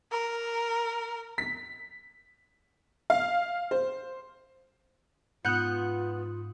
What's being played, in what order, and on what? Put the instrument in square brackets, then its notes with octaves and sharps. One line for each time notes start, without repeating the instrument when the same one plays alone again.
[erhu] A#4
[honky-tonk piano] B6
F5
C5
[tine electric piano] G#2 D#6 [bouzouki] B3 [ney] F4 [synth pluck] F#6 G6 C#7